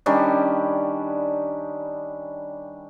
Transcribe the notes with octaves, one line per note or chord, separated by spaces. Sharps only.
D#3 G3 C#4 D4